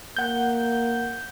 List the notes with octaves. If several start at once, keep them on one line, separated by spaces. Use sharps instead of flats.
A#3 F#5 G6